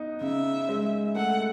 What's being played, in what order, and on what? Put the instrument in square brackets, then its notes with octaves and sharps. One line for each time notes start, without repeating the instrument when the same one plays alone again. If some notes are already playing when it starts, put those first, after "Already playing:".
Already playing: [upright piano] B3 D#4
[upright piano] C#3 [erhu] E5
[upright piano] G#3
[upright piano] A3 [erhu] F#5